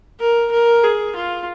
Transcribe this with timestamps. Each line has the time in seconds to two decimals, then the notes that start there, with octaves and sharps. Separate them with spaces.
0.20 A#4
0.52 A#4
0.84 G#4
1.16 F4